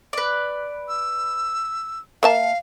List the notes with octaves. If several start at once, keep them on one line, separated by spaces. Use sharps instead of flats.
B4 D5
E6
A#3 E5 F5 A5